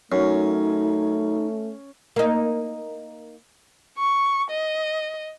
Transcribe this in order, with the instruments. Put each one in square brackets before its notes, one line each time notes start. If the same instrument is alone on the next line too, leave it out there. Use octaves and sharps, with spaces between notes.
[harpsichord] F#2 [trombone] A3 [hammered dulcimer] C#4 [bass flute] D#4
[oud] A#3 D#4
[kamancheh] C#6
D#5